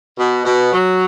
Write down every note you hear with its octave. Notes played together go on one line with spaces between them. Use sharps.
B2
B2
F#3